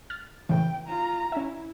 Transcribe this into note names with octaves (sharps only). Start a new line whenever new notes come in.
F6 A6
A2 C#3 E3 G5
F4 A#5
C#4 E4 E5